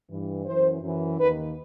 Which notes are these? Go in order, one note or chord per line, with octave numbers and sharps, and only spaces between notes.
G2 E3
F#2 E3 C5
F#2 E3
D#2 D#3 B4